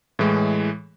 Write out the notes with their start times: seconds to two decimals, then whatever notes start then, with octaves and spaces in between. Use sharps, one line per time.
0.19 A2 E3 G#3